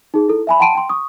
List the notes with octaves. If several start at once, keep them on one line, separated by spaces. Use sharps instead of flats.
D#4 G#4
E4 A4
E5 G#5 B5
F#5 G5 A5 C6 D7 D#7
G5 C6
C#6 D#6